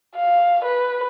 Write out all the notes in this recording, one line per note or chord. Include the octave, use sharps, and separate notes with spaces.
F5
B4